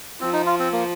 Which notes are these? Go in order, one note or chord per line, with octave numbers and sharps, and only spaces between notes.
F3 C4
D#4
F4
C4
A#3